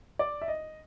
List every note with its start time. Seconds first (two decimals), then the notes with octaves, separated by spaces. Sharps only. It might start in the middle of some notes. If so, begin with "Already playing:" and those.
0.19 D5
0.42 E5
0.48 D#5